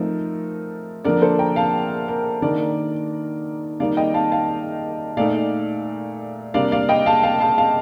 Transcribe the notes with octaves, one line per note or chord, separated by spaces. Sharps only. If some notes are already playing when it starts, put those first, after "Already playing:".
Already playing: F3 A3 C4 D#4 A#4
D3 F3 A#3 D4 A#4 D5
A4 C5
G5 A#5
F5 A5
A#4
D#3 A#3 D4 A#4 D5
D#3 G3 A#3 D#4 D5 F5
D#5 G5
F5 A5
F5 A5
A#2 A3 D#4 D5 F5
C3 G3 A#3 D4 D5 F5
D5 F5
D#5 G5
F5 A5
F5 A5
F5 A5
F5 A5